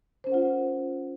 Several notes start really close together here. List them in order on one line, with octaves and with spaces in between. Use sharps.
C5 C#4 A#4 F#5 F4